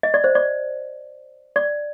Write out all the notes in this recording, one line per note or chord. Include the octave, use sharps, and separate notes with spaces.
D#5
D5
C5
D5
D5